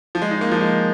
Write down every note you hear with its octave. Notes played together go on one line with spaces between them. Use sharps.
F3
G#3
D#4
A#3
F3
G#3